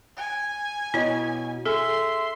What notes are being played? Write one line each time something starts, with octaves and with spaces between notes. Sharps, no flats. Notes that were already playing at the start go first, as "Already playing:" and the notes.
G#5
B2 E4 C#5 D#5
G#4 A4 E5 C6